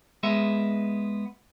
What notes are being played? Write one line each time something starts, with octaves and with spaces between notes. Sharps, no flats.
G#3 B3 E5